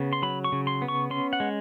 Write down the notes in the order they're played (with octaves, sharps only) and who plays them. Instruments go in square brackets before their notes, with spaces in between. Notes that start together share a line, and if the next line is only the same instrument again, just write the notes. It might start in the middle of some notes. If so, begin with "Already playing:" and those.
Already playing: [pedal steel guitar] C#3 B3
C6
F#3 B5
C#6
C#3
C6
B3
C#6
C#4 C6
F#5
G#3